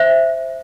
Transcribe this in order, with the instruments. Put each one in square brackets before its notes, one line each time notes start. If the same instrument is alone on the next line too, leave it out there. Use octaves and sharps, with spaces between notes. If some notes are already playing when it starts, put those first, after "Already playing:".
Already playing: [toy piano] C5 E5